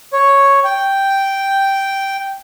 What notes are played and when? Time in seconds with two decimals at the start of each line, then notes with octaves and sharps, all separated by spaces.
0.13 C#5
0.64 G5